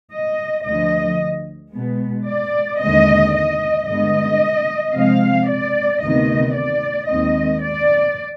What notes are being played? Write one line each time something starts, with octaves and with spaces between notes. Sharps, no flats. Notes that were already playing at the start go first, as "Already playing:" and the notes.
D#5
D2 D3 F3 D#5
B2 G#3 B3
D5
D#2 D3 G#3 C4 D#5
D#5
G2 D3 G#3 B3 D#5
C3 F3 G#3 C4 F5
D5
D2 C3 D#3 B3 D#5
D5
D#2 D#3 G#3 C4 D#5
D5